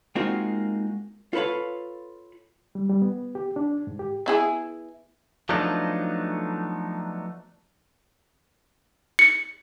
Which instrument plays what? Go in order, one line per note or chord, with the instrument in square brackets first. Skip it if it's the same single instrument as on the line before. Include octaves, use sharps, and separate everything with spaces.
[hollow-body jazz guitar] G#3 A#3 C4 D#4 F4 F#4
F4 A4 B4 C#5 F5
[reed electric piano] G3
G3
B3
G4
D4
G#2
G4
[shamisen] B3 E4 G#4
[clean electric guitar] F3 F#3 A3 B3 D4 D#4
[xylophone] C#7